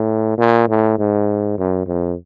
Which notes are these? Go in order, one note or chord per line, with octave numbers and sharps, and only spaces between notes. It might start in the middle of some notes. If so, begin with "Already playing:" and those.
Already playing: A2
A#2
A2
G#2
F#2
F2